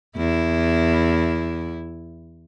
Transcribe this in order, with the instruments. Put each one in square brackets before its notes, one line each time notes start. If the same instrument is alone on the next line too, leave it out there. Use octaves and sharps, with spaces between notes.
[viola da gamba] E2 E4